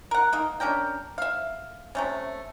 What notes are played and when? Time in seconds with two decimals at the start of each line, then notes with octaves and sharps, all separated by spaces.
0.11 A#4 F#5
0.32 A#3 D#4 A#4
0.60 C#4 D4 A#4 G5
1.18 E5 F5
1.95 C3 A3 C#4